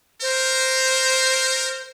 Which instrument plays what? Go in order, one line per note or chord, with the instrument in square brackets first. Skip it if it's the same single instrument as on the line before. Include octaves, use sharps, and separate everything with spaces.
[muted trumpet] A#4 [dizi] C5